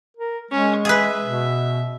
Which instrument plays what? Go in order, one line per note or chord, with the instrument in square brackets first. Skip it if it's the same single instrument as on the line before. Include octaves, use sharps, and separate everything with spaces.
[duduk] A#4
[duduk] G#3 [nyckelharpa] C#4
[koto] G#4 B4 [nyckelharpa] E5
[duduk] B2